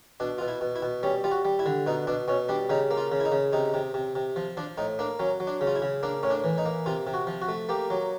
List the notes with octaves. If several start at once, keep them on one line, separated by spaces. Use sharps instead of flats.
B2 D4
B2 F4
E4
B2
E4
B2
G3 C#4
G3 F4
F#4
G3
E4
D3
B2 D#4
B2 D4
B2 C#4
G3 D4
C#3 D#4
A#3
F4
C#3
E4
D#4
C#3
C3 D#4
C3
C3
C3
F3
F3 D4
A2 D#4
A#3 D4
F#3 C#4
F#3
D4
C#3
F4
E4
C#3
A#3 D4
A2 C#4
D4
E3
D#4
A#3
C3 F4
C3
F#4
F3
F#4
A3
A#3 G4
F#3